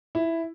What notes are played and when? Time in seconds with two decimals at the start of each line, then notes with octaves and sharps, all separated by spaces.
0.15 E4